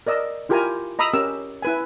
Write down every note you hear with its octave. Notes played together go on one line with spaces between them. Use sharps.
A#4 D5 D#5 E6
E4 F4 G4 A#4 G#5 A#5
D#5 A#5 B5 D#6 E6
C#4 G4 A#4 E6
E4 B4 G#5